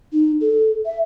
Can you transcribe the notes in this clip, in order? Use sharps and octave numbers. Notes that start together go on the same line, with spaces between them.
D#4
A4
E5